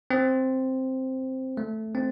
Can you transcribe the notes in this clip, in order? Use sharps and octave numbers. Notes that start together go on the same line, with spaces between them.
C4
A3
C4